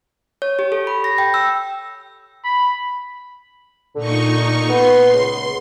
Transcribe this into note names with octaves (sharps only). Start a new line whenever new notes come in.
C#5
G4
A4
B5
A#6
G5
E6
B5
A#2 D3 D#4 C#6
B3 C6
C#2